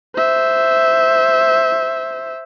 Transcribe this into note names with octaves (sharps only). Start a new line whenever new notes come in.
C5 E5